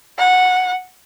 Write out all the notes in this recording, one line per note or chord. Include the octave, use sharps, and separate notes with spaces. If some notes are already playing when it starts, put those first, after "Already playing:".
F#5